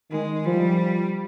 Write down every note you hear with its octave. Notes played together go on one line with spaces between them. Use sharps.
D#3 G#3
F3 G3